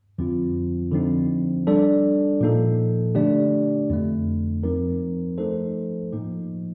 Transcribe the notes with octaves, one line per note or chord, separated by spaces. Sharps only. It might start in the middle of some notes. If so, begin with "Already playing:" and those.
F2 D3 F3 C4 F4
D3 F3 C4 D#4
G3 D4 A4 D5
A#2 F3 A#3 D#4 A4
D3 A3 D4 G4 D5
F2 D3 A3
F3 C4 D#4 A#4
F3 A3 D#4 A4 C5
A2 F3 A#3 D#4